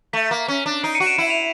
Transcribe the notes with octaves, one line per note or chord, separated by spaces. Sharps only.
A3 B6
A#3
C#4
D4
D#4 C7 D7
C#7 D#7
F#4
D7 E7
E4 D7 E7
D#7 F7